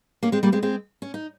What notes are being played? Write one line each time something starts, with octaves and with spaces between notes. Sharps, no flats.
A#3 C#4
G#3 C4
G3 A#3
G#3 C4
G#3 C4
C#4
D#4